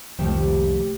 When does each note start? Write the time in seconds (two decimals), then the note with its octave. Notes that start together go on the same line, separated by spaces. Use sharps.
0.19 F1 C2 D#3 F3 A3 A#3 G4 C5